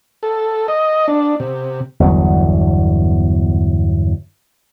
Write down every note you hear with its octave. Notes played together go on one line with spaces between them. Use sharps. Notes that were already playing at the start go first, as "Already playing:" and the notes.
A4
D#5
D4
C3
G1 E2 F#3